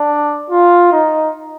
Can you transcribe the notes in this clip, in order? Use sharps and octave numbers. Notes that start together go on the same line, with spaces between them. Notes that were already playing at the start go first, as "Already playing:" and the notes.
Already playing: D4
F4
D#4